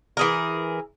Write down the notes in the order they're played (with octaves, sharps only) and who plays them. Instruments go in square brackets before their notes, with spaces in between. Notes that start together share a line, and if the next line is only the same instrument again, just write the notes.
[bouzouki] E3 G#4 A#4